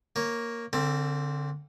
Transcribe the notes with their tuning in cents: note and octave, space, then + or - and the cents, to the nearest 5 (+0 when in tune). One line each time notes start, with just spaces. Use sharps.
A#3 +0 C#5 +0
D3 -25 C4 +0 A4 +45